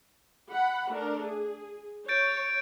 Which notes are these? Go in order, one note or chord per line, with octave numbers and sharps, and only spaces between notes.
F#5 B5
A3 D4 A#4
G#4
C#5 G6 A6 D7